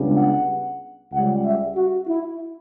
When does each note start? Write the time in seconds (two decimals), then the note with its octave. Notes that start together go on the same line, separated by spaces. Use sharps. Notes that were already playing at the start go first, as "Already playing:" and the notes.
Already playing: C#2 C#3 G3 B3 D4
0.17 F#5
1.12 C#2 C#3 G3 F#5
1.44 E5
1.76 F#4
2.08 E4